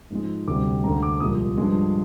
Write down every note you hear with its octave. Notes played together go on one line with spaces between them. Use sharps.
G#2 F3 G#3
D2 C3 G3 D6
D2 D3 G#3 A#5
D6
C2 A#2 F3 G#3 D#6
G2 F3 G#3